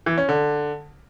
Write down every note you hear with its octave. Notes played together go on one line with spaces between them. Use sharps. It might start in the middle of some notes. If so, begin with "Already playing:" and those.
E3
C#4
D3